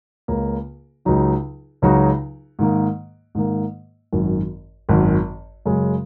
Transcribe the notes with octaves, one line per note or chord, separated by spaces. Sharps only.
C#2 C#3 A#3
C#2 C#3 F#3 D#4 F#4
C#2 C#3 F#3 D#4 F#4
G#2 D#3 A#3
G#2 D#3 A#3
G#1 F#2 D#3
G#1 F#2 D#3
F#2 C#3 G#3